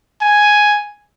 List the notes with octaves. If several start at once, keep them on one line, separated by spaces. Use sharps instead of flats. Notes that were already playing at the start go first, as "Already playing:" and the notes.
G#5